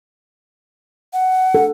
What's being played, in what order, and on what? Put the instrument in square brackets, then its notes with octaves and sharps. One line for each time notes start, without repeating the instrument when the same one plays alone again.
[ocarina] F#5
[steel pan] A4